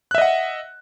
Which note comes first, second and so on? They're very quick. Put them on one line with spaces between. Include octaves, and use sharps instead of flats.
F#6 E5 D#5 F#5